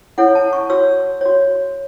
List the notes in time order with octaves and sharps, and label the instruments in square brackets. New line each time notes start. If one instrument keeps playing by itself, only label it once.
[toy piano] E4 A4 C#5 F#5
A5
C#6
F#4 C#5 E6
F#4 C#5